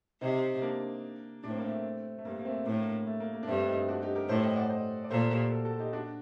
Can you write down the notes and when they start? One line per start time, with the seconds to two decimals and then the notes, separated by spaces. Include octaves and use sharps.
0.21 C3 C4 D#4
0.62 A#3 D4
1.44 A2 D4
1.51 C4
1.58 A#3
1.65 A3 C4
2.18 A3
2.25 G2 A#3
2.40 A#3
2.45 A3 C4
2.66 A2 A#3 D4
2.79 A#3
3.07 A3
3.20 A#3
3.34 A#3
3.43 D4
3.48 G2 A3 C4
3.68 C4 D#4
3.88 D4 F#4
4.02 D#4 G4
4.15 G4 A#4
4.29 A2 A4 C5
4.42 D#5 G5
4.56 D5 F#5
4.70 C5 D#5
5.04 D5
5.11 A#2 A4 C5
5.31 G4 A#4
5.52 F#4 A4
5.65 F#4 A4
5.79 D#4 G4
5.93 D4 F#4